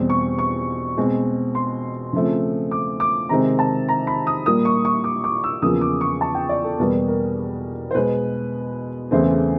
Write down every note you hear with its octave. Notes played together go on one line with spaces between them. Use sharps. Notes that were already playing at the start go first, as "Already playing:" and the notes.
Already playing: E2 B2 G3 C4
C#6
C#6
B2 G#3 C4
C6
C#3 F3 A3 C4
D6
D6
C3 D#3 G#3 C4 A#5
A5
A#5
B5
D#6
A#2 G3 A#3 D#6
C#6
C#6
D6
D6
E6
E2 C#3 F3 A#3 D#6
D6
C#6
A5
G5
D5
A4
E2 B2 G3 A#3 B4
A#4
C5
B2 G#3 B3 B4
E2 C#3 E3 A3 C4 C5